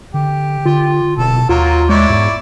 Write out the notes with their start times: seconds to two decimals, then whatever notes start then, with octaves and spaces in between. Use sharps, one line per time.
0.14 D3 G4
0.65 D3 F4
1.18 D1 B2 A4
1.49 D#2 F#3 A#3 F4
1.89 G#3 E4 C#5 D5
2.10 E2 G#2